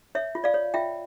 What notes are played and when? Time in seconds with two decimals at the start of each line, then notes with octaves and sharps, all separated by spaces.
0.15 C#5 E5
0.35 F4
0.44 D5 F5
0.54 C#5
0.74 F4 E5 G5